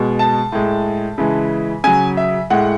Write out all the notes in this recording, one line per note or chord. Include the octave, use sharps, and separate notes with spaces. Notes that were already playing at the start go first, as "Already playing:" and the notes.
Already playing: B2 G#3
A5
A2 G#3
C#3 E3 G#3
C#3 F#3 G#5
E5
A2 G#3 F#5